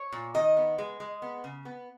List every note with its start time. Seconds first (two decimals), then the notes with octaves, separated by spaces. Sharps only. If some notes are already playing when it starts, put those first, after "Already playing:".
Already playing: C#5
0.12 A#2
0.34 D#3 D#5
0.57 B3
0.78 G#3
1.00 G#3
1.22 B3
1.44 C#3
1.65 B3